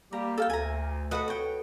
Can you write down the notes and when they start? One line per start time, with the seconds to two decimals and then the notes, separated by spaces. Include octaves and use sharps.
0.13 G3 A#3 G4 A#5
0.38 A4 F5 G5
0.50 D2 G#5 A#5
1.11 F#4 A4 B4 D#5 F#5
1.28 C#5 G5